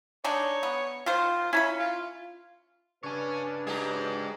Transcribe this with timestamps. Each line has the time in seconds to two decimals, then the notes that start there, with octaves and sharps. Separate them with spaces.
0.24 G#3 D4 D#4 C#5
0.63 B3
1.06 D#3 F4 C5
1.53 C#4 E4 A#5 B5
1.79 F4
3.03 G2 C#3 D4 B4 C#5 G#5
3.67 F#3 G#3 D#4 G4 G#4 B4 A#5